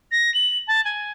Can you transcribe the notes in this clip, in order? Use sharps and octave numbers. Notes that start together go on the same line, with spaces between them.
A#6
F#7
A5
G#5